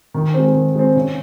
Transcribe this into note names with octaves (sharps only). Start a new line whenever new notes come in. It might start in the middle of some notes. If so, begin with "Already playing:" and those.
D#3
G#3 C4
D#3
G#3 C4
C#3